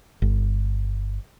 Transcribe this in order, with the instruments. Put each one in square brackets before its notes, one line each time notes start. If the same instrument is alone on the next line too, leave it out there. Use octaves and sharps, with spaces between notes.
[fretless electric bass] G1